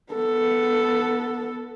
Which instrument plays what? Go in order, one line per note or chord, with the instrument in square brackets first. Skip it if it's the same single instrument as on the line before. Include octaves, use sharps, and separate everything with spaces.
[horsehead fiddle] B3 A4